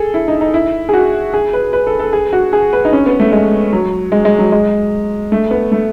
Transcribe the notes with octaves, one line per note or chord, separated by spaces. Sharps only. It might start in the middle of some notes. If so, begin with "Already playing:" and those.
Already playing: G#4 A4
E4
D#4
D#4
E4
G#4
F#4
G#4
B4
B4
A4
A4
G#4
F#4
G#4
B4
D#4
C#4
B3
A3
G#3
F#3
G#3
G#3
F#3
G#3
A3
B3
A3